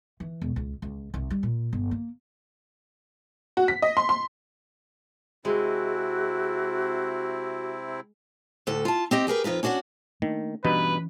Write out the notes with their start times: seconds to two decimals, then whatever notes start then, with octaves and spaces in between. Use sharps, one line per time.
0.20 E3
0.42 E1
0.56 C#2
0.82 C#2
1.14 C2
1.30 G3
1.43 A#2
1.73 G1
1.91 A#3
3.57 F#4
3.68 B6
3.82 D#5
3.97 C6
4.09 C6
5.45 C3 G#3 C4 E4 F#4
8.67 D2 A2 A4
8.85 F4 A5
9.11 C4 G4 D#5
9.27 G4 G#4 A#4 B4
9.44 F2 C3 D#4 F4 B4
9.63 C#4 D4 F#4 C#5 F#5
10.22 D#3 A3 A#3 D4
10.64 G2 B2 E3 C#4 D#4 B4